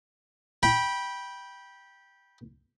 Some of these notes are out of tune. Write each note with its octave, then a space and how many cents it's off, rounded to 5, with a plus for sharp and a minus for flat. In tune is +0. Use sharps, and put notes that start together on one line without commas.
G5 +0 B5 -20